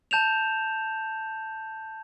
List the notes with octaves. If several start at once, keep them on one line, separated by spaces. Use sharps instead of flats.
A5 G6 E7 F7